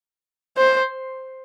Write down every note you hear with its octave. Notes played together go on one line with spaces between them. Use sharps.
C5